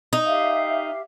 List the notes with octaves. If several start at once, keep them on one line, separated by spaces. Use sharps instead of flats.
D#4
G4 E5 F5